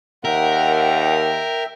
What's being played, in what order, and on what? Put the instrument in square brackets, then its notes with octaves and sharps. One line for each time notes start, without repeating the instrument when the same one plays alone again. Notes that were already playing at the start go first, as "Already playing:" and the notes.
[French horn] D#2 [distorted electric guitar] A#4 [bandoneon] E5 G5 [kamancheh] F#5